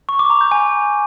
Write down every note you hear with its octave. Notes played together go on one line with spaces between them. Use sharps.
C#6
D6
A#5
G6
G#5